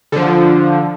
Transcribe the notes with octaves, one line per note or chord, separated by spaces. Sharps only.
D3 F3